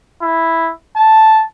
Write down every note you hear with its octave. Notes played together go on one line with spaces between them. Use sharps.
E4
A5